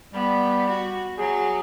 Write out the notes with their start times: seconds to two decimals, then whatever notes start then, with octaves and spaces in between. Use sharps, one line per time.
0.14 G3 B3
0.70 F#4
1.18 F#3 G#4